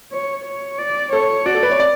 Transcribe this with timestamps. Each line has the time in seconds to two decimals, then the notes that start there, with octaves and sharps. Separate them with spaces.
0.12 C#5
0.45 C#5
0.79 D5
1.13 A4 C#5
1.46 F#4 D5
1.54 A4
1.63 B4
1.71 C#5
1.80 D5